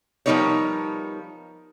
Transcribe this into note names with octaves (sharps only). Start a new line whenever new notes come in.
F3 G3 B3 D#4 A#4 C#5